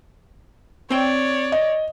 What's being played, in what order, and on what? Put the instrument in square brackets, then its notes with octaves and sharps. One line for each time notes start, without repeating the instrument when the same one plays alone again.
[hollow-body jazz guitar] C4 G5 [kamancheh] C#5 D5
[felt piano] D#5